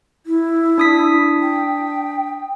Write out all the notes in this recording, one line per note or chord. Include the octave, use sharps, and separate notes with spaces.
E4
D4 D#6 B6
G5